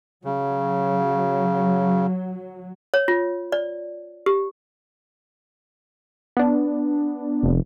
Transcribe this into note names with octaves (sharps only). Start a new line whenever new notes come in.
C#3 F#3
C#5
F4
D5
G4
B3 D4
F1